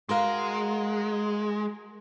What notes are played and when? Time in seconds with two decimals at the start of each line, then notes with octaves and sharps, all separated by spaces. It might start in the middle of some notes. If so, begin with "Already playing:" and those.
0.09 G#3 F#4 A#4 F5